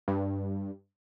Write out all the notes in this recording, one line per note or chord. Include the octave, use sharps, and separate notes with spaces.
G2